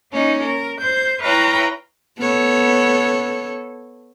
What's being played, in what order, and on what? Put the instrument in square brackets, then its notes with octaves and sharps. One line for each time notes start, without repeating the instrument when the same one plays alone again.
[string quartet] A#3 C#4 D#4
A#4
C5 G6
E4 B4 C#5 F5 G5 A#5
[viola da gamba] B3 A4 C#5